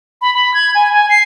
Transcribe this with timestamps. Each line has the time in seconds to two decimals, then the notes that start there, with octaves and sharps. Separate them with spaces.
0.21 B5
0.34 B5
0.54 G#6
0.75 G#5
0.93 G#5
1.10 C7